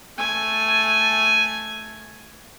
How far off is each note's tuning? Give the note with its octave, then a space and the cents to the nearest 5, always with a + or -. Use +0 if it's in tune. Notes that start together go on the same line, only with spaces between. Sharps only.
A3 +0 G#5 +0